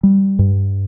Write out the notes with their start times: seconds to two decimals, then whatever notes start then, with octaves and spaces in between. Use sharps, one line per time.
0.03 G3
0.39 G2